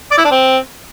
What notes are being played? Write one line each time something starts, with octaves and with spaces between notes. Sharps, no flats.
D5
E4
D4
C4